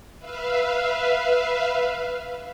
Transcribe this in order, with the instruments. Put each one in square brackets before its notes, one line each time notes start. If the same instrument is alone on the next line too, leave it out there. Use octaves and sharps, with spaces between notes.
[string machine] B4 E5 F5